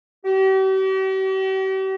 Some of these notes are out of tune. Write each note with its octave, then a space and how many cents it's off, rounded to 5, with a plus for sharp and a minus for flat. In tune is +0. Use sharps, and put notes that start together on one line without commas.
G4 -45